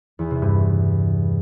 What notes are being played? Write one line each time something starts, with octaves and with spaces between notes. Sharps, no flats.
E2
C3
G2